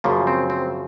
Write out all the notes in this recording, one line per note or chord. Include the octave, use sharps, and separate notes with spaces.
F#2 C#3 F3 A#3
C4
C4